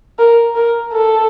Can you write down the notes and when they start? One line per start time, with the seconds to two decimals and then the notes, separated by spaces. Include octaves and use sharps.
0.19 A#4
0.55 A#4
0.92 A4